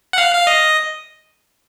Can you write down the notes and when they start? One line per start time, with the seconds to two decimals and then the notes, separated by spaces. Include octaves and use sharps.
0.13 F#5
0.18 F5
0.35 F5
0.47 D#5